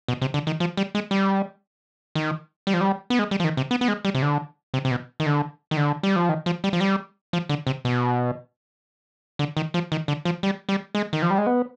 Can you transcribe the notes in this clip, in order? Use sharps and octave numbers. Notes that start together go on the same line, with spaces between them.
B2
C3
D3
D#3
F3
G3
G#3
G3
D#3
G3
F3
G3
B3
G#3
G3
F3
D#3
C3
B3
B3
G#3
G3
C3
D3
C3
C3
B2
D#3
D3
D#3
D3
G3
F3
D#3
F3
G3
F3
G3
F3
D3
C3
B2
D3
D#3
F3
D#3
D3
F3
G3
G3
G#3
D#3
F3
G3
G#3
B3